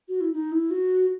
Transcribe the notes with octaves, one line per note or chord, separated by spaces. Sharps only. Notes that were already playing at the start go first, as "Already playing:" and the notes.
F#4
E4
D#4
E4
F#4